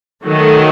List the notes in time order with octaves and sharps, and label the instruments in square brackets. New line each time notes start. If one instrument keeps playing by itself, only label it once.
[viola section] D#3 F#3 A3